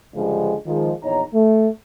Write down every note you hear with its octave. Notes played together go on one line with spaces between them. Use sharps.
C#2 G2 D3 F3 G3 G#3
D#3 F3 G#3
A#1 E2 D#4 C#5 A#5
A3